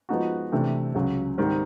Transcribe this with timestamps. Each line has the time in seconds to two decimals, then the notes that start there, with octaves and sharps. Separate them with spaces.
0.09 F3 G#3 B3 D#4 F#4
0.52 C3 E3 A3 D4 G4
0.95 C#2 C#3 F#3
1.38 G#2 D#3 G3 C4